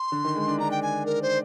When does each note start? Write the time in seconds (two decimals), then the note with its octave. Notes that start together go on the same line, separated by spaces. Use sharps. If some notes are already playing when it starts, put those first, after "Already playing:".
Already playing: C6
0.12 D3
0.25 D#3
0.35 G#3
0.48 D4
0.59 D4 A#5
0.71 G5
0.83 G#5
1.06 A#4
1.22 C5